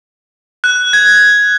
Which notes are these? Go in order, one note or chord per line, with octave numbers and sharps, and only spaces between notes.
F#6
G#6